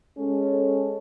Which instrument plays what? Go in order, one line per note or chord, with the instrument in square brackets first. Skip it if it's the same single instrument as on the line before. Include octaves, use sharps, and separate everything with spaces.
[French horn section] G#3 C#4 A4